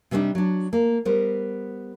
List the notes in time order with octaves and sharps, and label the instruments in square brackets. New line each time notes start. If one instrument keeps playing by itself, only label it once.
[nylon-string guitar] C3 G3 A#3 C4 D4 D#4
F#3 D4
A#3
G3 B3 A#4 C5